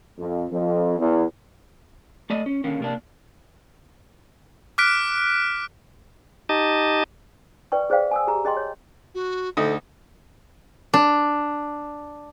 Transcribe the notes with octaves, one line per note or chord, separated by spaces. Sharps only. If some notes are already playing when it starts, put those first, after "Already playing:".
F2
F2
E2
A3 D5 D#5
C#4
D3 D#3 A#3 C#4
C3 A#3 D4
D6 F6 F#6 B6 D7
D#4 G4 D#5 A5
B4 D5 G5 C#6
G#4 C5 D5 F5 G5
G#5 D#6 E6
G4 G#4 A#5
G#4 D#5 G5 C6
C#5
F#4
D2 D#4 A4 D#6
D4